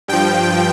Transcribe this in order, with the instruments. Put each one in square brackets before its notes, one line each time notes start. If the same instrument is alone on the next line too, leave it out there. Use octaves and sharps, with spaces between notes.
[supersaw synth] G2 F3 G5